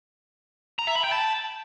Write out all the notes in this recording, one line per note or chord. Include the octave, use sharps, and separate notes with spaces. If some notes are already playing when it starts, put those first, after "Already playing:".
A#5
E5
B5
G5
A5